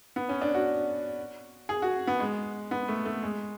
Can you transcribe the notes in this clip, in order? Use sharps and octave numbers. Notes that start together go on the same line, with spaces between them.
B3
C#4
D4
F#4
G#4
F#4
B3
G#3
B3
A3
A3
G#3